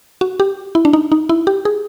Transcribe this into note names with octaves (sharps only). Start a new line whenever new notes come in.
F#4
G4
E4
D4
D#4
D#4
E4
G4
G#4